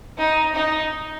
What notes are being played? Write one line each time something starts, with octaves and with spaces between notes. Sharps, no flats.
D#4
D#4